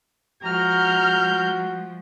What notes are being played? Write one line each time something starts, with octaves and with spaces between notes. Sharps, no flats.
F3 G#3 F#4 A#5 F6 G6